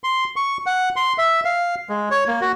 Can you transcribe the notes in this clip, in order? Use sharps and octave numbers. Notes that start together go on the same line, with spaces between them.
C6
C#6
F#5
C6
E5
F5
G#3
C#5
A#3
F#4